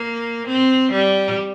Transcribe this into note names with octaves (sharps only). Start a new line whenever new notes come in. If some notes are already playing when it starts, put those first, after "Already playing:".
Already playing: A#3
C4
G3